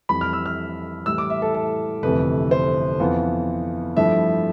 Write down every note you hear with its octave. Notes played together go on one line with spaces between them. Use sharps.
F2 E3 G3 B5
F6
E6
F6
A2 E3 G3 E6
D6
E5
A4
A4
G1 F2 C3 E3 A3 B4
C5
F2 E3 B3 F4
G2 F3 A3 E4 E5